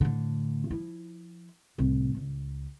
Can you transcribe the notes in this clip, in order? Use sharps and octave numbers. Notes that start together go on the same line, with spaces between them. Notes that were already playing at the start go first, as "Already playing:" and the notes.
A2 D3
F3 E4
C2 A2
C#2